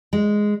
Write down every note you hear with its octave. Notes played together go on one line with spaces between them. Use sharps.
G#3